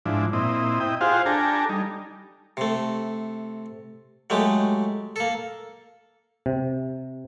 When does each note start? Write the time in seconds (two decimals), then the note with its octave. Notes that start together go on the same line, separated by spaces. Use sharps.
0.06 G#2 F3 D4 E4
0.33 A#2 C4 E4 D#5
0.80 E4 D#5 G5
1.01 F4 G4 G#4 C5 F5 F#5
1.26 D4 G4 A4 G#5 A#5
1.69 G3 D#4
2.57 C3 A3
4.30 F#3 G#3 A3 G4
5.16 A#3 A4
6.46 C3